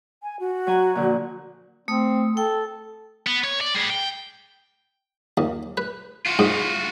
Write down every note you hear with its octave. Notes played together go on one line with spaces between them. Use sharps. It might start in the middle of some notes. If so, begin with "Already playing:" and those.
G#5
F#4
F#3 G#5 A#5
A#2 D3 F3
A3 C4 D#6
A4 G5
B3
C#5
D5
G3 G#4
G5
D#2
B4
F4 F#4
G#2